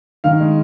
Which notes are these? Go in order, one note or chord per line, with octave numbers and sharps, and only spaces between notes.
D#3 F5
G#3